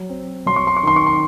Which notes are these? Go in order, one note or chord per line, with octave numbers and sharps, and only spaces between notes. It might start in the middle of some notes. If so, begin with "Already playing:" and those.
Already playing: F#3
C4
F#3 C6
C#6
C6
C#6
D#3 C6
C#6
C6